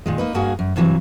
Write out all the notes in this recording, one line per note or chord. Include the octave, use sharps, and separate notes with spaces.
A#2 D#3 G#3
A#3 D#4 B4
G2 A#3 F#4 G#4
F#2
G2 C3 E3 F#3